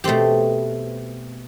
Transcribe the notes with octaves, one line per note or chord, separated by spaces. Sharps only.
B2 A3 C4 G4